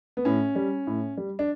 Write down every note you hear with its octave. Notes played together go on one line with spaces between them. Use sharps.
B3
A2 C#4
G3
A2
G3
D4